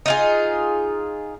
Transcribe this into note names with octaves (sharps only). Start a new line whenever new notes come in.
D#4 F4 G#4